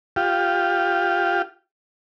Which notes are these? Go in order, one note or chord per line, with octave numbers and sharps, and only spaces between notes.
F4 G4